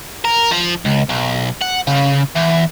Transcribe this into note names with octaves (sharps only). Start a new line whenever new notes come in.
A#4
F3
C#2
B1
F#5
C#3
E2